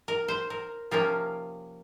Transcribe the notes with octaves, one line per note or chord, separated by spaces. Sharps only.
A#4
C5
A#4
C3 F3 A#3 C#4 A#4